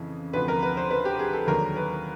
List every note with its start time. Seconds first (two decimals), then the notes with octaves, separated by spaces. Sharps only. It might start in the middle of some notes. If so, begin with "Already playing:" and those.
Already playing: F2 C#3 E3
0.33 D2 C3 F3 B4
0.48 A#4
0.63 B4
0.77 C5
0.91 B4
1.05 G4
1.19 G#4
1.33 A4
1.47 D#2 D3 F#3 A#4
1.76 B4